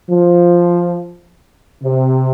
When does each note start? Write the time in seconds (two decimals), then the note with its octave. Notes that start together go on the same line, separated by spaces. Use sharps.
0.10 F3
1.83 C3